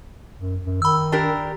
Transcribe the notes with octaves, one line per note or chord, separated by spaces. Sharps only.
F#2
F#2
D#3 B5 E6
D4 G4 A#4